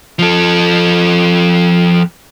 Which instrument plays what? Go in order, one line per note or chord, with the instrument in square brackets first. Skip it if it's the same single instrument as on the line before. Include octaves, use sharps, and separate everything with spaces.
[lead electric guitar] F3 A4